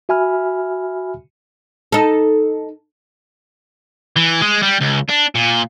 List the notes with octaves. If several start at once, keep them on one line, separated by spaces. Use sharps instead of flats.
F#4 E5 G#5 B5 F6
D#4 A4
E3
G#3
G3
C#2
D4
A#2